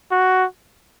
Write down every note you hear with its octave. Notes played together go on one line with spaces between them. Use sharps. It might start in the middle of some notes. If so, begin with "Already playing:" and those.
F#4